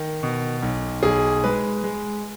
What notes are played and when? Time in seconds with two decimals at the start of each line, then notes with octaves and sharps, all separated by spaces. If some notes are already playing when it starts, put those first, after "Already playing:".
Already playing: D#3
0.23 B2
0.62 B1
1.03 B1 G#4
1.44 G#3 B4
1.84 G#3